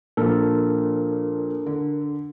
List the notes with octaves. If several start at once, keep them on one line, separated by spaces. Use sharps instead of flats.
A#2 F3 D4 A4 A#4
D3